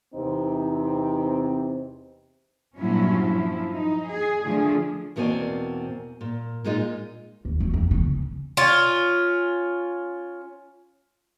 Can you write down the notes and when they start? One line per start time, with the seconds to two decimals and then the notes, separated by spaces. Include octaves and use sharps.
0.15 E2 C3 C4 D#4
2.78 G2 A#2 F3 F#3 C#4 E4
3.25 F3 E4
3.74 D#4
4.11 G#4
4.45 D3 F3 A3 D4 G#4
5.16 E2 B2 A#3 C4 D5 G#5
6.21 A#2
6.64 A#2 G#3 D#4 F4
7.45 D#2
7.60 F#3
7.74 F2
7.91 D#3
8.04 C#3
8.57 C#4 F4